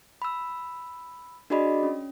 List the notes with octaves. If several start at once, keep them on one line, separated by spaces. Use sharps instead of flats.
B5 E6
D4 F#4 G#4 D5 D#5 B5
C#4